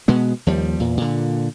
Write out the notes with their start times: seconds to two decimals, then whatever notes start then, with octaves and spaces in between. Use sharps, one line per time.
0.08 B2 G#3 B3
0.47 D#2 F3 G3
0.80 E2 A#2
0.97 A#2 D3